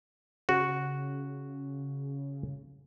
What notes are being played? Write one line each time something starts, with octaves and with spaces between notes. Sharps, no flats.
C#3 F#4